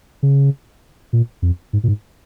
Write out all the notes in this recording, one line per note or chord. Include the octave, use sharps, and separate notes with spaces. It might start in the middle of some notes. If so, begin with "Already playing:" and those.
C#3
A#2
F2
G#2
A#2
G#2